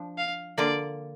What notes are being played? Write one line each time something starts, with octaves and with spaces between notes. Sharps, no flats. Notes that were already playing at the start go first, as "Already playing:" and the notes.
Already playing: F3 D4
F5
D3 A#3 F4 D5